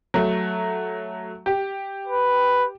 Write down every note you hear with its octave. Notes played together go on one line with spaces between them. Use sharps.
F#3 A3
G4
B4